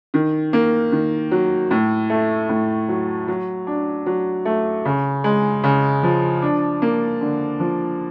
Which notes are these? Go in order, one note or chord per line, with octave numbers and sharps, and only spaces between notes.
D#3
A#3
D#3
F#3
A2
A3
A2
F#3
F#3
D4
F#3
A3
C#3
G#3
C#3
F3
D4
A#3
D3
F3